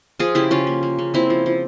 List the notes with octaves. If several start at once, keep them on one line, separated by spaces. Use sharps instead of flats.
F3 F4 G#4
C#3 E4 G4
C#3 C#4 F4
A#3
A#3
C#3
A#3 C4 E4
F3
F3